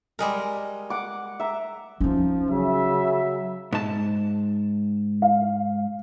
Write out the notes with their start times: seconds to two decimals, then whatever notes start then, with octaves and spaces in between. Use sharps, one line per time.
0.19 G3 G#3 A#4
0.90 F#5 D6
1.40 E5 A#5
2.00 F3 C#4 D#4
2.50 C#3 F#3 E5
3.72 G#2 A5
5.22 F5